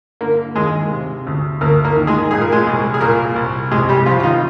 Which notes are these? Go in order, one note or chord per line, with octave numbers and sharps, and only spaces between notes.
D3 A#3 A#4
D#2 G#3 G#4
C3
D2
D2 A#3 A#4
A#3 A#4
D#3
G#3 G#4
A#2 G#4
A#4
G#3 G#4
C2
G#4
A#2 A#3 A#4
C2
C3 G#3 G#4
G3 G4
C2 F3 F4
F4
D#3 D#4